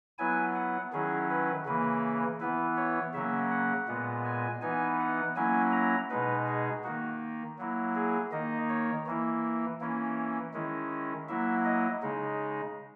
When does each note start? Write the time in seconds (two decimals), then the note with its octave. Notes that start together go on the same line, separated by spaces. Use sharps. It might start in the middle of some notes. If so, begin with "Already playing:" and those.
0.19 F#3 B3 E4 G#5
0.55 F#5
0.92 D#3 F#3 C#4 E4 G#4
1.30 B4
1.66 C#3 E3 A#3 B4
2.40 E3 B3 E4 B4
2.77 C#5
3.14 C#3 F#3 A#3 C#4 E5
3.51 F#5
3.88 A#2 G#3 B3
4.25 G#5
4.62 E3 B3 D#4 G#5
5.00 F#5
5.36 F#3 A#3 C#4 E4 G#5
5.73 A#5
6.10 B2 G#3 D#4 B4
6.47 G#4
6.84 D#3 A#3 D#4 F#4
7.58 F#3 A#3 E4
7.95 G#4
8.32 D#3 A#3 D#4 D#5
8.69 C#5
9.07 E3 A#3 E4
9.81 E3 A#3 C#4 E4
10.54 D#3 G#3 C#4 E4
11.29 F#3 A#3 E4 E5
11.65 D#5
12.02 C#3 G#3 D#4